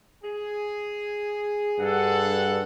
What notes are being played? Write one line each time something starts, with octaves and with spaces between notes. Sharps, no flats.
G#4
G2 A4 F#5